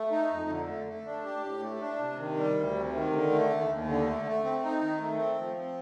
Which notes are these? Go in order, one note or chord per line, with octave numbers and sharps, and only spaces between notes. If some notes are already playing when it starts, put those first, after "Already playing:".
Already playing: A3
D#4
F2
D3
A3
A3
D4
G4
A2
A3
D4
C3
D#3
G3
D2
C3
D#3
D3
A3
D#2
D#2
D3
A3
A3
C4
D#4
D#3
A3
C4
F3
C4